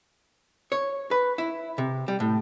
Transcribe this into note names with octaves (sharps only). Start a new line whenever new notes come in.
C#5
B4
E4
C3
G3
A2